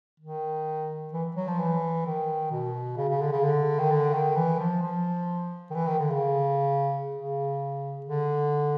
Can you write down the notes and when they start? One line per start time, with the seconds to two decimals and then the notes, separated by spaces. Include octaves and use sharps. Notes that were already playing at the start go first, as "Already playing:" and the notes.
0.20 D#3
1.13 E3
1.36 F#3
1.48 F3
1.60 E3
2.06 D#3
2.51 B2
2.97 C#3
3.09 C#3
3.22 D3
3.32 C#3
3.45 D3
3.79 D#3
3.91 D3
4.14 D#3
4.36 E3
4.59 F3
4.82 F3
5.71 D#3
5.75 E3
5.87 D#3
5.99 D3
6.11 C#3
7.15 C#3
8.06 D3